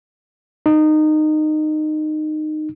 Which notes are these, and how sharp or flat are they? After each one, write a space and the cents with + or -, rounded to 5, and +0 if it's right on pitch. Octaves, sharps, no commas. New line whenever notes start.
D#4 -20